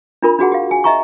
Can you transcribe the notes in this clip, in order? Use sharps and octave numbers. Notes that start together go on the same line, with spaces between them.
D4 F4 A#4 B5
D4 F#4 G#4 F#5
G4 F5
G#5
D#5 E5 A#5 C#6